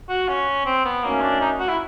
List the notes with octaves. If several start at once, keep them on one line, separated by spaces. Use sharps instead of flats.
F#4
C#4
C4
B3
D#3 F#3 A3 A#3 C#4
D4
D#4
F#4
E4